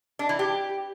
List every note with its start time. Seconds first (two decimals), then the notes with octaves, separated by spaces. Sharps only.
0.19 D4
0.29 E3
0.39 G4